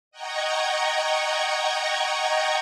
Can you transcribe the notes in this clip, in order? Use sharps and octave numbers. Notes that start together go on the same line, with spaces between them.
D#5 F#5 G5 A#5 C#6 G#6